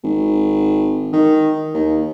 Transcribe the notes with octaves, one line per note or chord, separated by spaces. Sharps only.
G#1
D#3
D#2